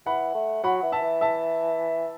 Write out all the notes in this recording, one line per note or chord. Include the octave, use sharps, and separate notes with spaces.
E3 F#5 B5
A3
F#3 F#5 B5
E3
E5 A5
E3
E5 A5